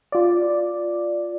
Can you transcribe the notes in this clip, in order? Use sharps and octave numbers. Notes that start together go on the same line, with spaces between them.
F4 D5